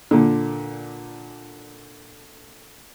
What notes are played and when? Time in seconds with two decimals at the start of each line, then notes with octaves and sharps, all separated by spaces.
0.11 A#2 D3